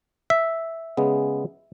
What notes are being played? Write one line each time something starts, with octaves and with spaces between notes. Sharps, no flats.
E5
C#3 G#3 B3